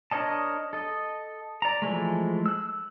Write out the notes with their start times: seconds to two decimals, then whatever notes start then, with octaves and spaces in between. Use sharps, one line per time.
0.11 D4 A#4 C#5 D#5 A5
0.73 A4 D#5
1.62 D5 A#5
1.82 E3 F3 G#3 A3
2.46 E6 F#6